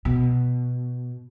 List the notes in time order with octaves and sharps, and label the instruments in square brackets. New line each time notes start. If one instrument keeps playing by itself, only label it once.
[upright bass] B2